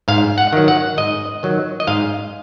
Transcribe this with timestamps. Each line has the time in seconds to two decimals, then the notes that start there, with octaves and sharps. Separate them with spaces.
0.08 G#2 F5
0.38 F#5
0.53 D#3 F#3
0.68 F#5
0.97 G#2 D#5
1.43 D#3 F#3
1.80 D#5
1.87 G#2 F5